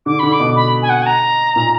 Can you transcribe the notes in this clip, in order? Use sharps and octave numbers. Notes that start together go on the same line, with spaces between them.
D3 D6
D3 B5
D6
B2
B5
G#5
F#5
G#5
A#5
A#2